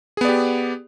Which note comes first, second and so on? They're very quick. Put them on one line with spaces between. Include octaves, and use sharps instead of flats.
G#4 B3 D5 G4